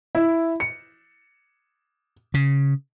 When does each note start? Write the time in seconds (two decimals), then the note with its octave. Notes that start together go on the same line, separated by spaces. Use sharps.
0.15 E4
0.60 C#7
2.34 C#3